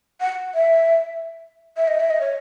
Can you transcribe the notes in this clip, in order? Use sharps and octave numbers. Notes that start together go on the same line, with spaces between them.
F#5
E5
E5
D#5
E5
D#5
C#5